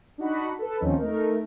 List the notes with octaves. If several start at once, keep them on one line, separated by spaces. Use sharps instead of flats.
D4 D#4 F#4 F#5 B5
A4 B4
D#2 F3 C4 C#4 D#4
A3 D#4 A#4